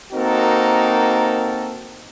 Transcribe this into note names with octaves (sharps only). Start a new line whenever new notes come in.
A#3 C4 D#4 F#4 A4 A#4